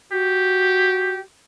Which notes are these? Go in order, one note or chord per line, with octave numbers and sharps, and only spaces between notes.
F#4 G4